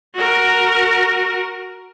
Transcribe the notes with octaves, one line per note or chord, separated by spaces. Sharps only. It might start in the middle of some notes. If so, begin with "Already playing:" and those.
F#4 A#4